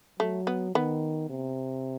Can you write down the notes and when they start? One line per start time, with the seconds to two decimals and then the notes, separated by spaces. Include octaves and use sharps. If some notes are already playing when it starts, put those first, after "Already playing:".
0.20 F#3 A3
0.47 B3
0.75 D#3 B3
1.30 C3